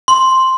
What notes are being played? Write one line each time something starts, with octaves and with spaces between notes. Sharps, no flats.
C6